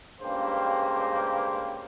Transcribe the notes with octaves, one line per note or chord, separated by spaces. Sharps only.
C#2 G2 C#3 A#3 G4 C5